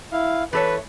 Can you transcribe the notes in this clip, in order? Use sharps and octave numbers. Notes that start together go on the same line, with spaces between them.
E4 F5
E3 A4 B4 C#5